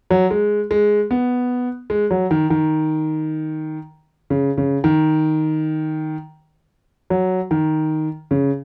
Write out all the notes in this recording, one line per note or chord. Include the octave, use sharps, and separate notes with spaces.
F#3
G#3
G#3
B3
G#3
F#3
D#3
D#3
C#3
C#3
D#3
F#3
D#3
C#3